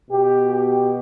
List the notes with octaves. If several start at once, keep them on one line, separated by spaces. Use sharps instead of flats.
B2 G4
G4